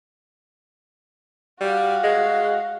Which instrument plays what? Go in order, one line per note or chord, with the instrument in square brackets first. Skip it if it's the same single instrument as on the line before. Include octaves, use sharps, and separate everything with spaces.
[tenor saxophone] G3 [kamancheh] F#4 F5
[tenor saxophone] G#3